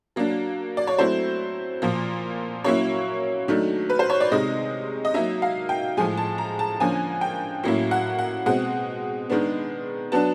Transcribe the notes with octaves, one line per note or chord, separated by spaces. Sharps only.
F#3 A#3 D4
D5
C#5
F#3 A3 C4 E4 C5
A#2 F3 A#3
F#3 A#3 C#4 E4 C#5
D#3 F#3 A3 D4
B4
C5
C#5
D5
C3 D#3 G#3 D#5
D#5
F#3 A#3 D#4 E5
F5
G5
A2 F3 G#3 G#5
A5
A#5
A5
D3 F3 A#3 C#4 G#5
G5
A2 F#3 A#3 C#4 E4
F#5
F#5
B2 G#3 C4 F#5
D#3 G#3 B3 D4
F#3 B3 D4 A5